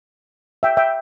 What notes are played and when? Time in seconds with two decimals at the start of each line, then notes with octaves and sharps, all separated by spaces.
0.63 E5 G5
0.77 E5 G5